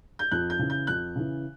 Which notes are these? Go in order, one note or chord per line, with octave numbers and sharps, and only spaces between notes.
G6
F2 F#6
G6
C#3 E3
G6
F2 F#6
C#3 E3